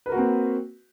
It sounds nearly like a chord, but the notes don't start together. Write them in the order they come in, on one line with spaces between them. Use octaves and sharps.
B4 A#4 F#4 A#3 C4